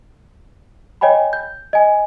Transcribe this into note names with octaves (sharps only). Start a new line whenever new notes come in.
C#5 D#5 G5 G#5 B5
G6
D#5 G#5